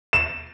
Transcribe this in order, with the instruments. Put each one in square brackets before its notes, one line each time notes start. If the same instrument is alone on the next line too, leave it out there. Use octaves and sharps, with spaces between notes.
[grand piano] E7